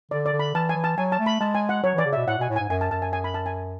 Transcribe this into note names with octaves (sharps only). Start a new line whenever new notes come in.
D3 D5
D5
D3
B5
E3 A5
G#5
E3
A5
F#3 G#5
A5
A3
B5
G#3 A5
G#5
F#5
F#3 C#5
E3 D5
C#3
E5
B2
A2 F#5
B2 G#5
A2
G#5
G#2
F#2 G#5
A5
F#2 A5
G#5
G#5
B5
A5
G#5